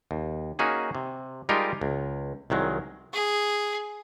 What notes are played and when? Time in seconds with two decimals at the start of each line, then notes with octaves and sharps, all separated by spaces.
0.11 D#2
0.59 A#3 C#4 D#4 F#4 G#4
0.95 C3
1.49 G3 G#3 D#4 F4 G4 A#4
1.81 C#2
2.50 C2 D#3 F#3 G#3
3.14 G#4